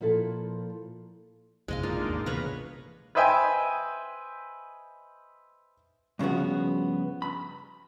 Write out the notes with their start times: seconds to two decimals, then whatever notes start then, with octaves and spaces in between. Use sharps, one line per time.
0.01 A#2 F3 E4 A4
1.68 A#1 F#2 C3 G#3 D#5 F5
1.83 G#3 A#3 D4 D#4 F4
2.07 G#1 D#2
2.26 C3 E3 A#3 B3 B4 C#5 F5 A#5
3.15 B4 C5 D#5 E5 G5 G#5
6.19 G2 C#3 F3 B3 F#4
7.22 B5